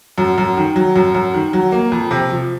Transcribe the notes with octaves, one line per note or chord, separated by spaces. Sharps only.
F#2
F#2
D#3
F#3
F#2
F#2
D#3
F#3
A#3
F2
C3
F3